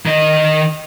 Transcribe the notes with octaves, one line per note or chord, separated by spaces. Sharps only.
D#3 D#5